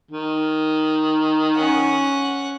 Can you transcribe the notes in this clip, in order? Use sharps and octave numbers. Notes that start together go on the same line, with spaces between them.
D#3
C#4 F#5